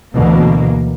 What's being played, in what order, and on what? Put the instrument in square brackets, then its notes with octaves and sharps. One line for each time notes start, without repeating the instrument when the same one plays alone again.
[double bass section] D2 B2 [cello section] E3 A#3